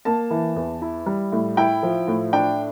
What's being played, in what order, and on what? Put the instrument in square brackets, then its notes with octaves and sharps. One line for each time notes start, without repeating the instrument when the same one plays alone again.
[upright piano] A#3 A5
E3
E2
E4
G3
A2
E4 G5
F3
A2
D4 G5